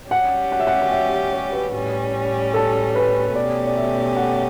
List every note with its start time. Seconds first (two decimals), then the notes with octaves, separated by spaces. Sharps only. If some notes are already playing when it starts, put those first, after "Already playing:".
0.10 G3 C#4 G4 F#5
0.52 F#5
0.60 E5
0.67 F#5
0.82 F#5
0.92 E5
1.33 C#5
1.52 B4
1.74 A2 G3 C#4
2.54 A4
2.95 B4
3.35 B2 A3 C#4 G4 D5
3.67 D5
3.77 E5
4.16 F#5